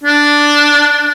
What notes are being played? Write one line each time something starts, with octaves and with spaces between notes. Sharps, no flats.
D4